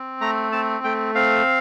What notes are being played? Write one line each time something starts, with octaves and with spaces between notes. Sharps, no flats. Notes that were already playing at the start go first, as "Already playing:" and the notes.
Already playing: C4
A3 A#5
C4 A5
A3 G5
C4 F5